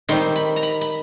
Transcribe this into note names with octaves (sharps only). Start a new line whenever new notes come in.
D#3 G3 C4 C6
B5
A#5
B5
B5